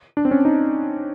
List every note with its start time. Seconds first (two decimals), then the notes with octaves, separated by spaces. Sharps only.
0.17 D4
0.25 C4
0.31 C#4
0.45 D#4